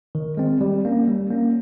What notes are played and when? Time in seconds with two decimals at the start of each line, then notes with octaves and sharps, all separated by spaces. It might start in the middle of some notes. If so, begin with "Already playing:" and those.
0.15 D#3
0.37 G#3 C4
0.61 G3
0.85 A#3 C#4
1.08 G3
1.30 A#3 C#4